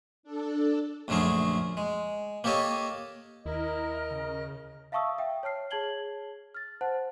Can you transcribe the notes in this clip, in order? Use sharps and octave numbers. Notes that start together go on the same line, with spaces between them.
D4 A4
A#1 F#2 D3 A3 G#4 A#4
G#3
A#3 G4 A4 C#5 D#5
D#2 E4 A#4 D#5
C#3
E5 F5 A5 C#6 D#6 E6
E5 G5
C#5 A5 F6 C7
G#4 C#5 A5 G#6 F#7 G7
F6 A6
C5 F#5 A5